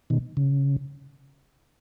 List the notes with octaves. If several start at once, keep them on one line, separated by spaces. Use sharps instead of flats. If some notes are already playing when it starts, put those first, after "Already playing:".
B2 D#3
C#3